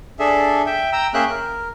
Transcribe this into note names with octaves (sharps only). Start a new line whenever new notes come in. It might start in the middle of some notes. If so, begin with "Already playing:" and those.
D4 G#4 A4 E5
E5 G5
G5 A#5 E6
A#3 C#4 G#4 E5 G5 F#6
A#4